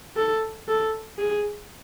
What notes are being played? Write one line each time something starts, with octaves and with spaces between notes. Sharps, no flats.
A4
A4
G#4